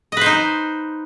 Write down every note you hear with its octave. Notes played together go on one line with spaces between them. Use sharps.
D#4 B4 C5 D#5